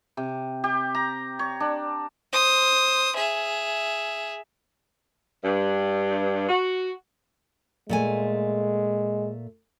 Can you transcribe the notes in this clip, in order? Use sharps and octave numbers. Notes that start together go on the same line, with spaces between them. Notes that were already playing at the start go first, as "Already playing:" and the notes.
C3
G4
A#5
C#5
D4
C5 D#6
G#4 E5
G2
F#4
A#2 G#3 A3 G#5